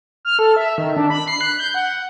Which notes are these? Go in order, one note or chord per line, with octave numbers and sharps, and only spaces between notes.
F6
A4
E5
D#3
D4
B5
C7
F#6
G6
F#5